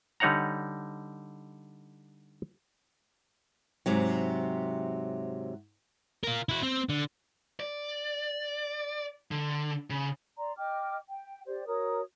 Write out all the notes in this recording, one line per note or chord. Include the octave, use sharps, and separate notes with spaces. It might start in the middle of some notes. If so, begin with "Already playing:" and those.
D3 G3 D#4 C#5 F#5 A#5
G#2 C3 F#3
F4 A#4
E4 F#4
C4
D3
D5
D3
C#3
D5 A#5 C6
D#5 G5 D6 F6
G5
G4 C5 D5
F#4 A#4 C#5 D#6